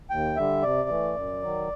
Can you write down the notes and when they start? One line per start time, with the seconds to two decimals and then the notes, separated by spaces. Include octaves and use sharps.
0.10 D#2 G5
0.36 D3 G3 E5
0.62 C3 D5
0.89 E3 A3
1.16 F#2
1.42 D#3 F#3